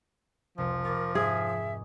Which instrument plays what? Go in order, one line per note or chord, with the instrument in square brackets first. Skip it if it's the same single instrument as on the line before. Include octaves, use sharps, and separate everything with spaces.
[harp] F1 C2 [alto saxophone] F3
[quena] A#4 [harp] C#6 D6 A6
[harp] G#2 C4 [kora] G#4 [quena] E5